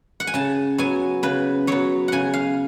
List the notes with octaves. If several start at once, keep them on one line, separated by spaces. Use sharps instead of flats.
F#5
G#5
C#3 A5
F#3 B3 G#5
C#3 B4
F#3 B3 C#5
C#3 F#5 G#5
F5